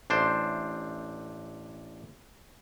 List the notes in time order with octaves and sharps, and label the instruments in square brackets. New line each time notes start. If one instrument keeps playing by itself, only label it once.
[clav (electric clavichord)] A1 D4 C5